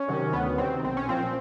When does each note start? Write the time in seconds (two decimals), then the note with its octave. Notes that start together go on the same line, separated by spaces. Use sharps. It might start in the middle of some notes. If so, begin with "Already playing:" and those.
Already playing: C#4
0.08 C3 D#3 F#3
0.33 D2 B3
0.58 C3 D#3 F#3 C4
0.84 B1 C4
0.97 C#4
1.09 A#2 F3 C4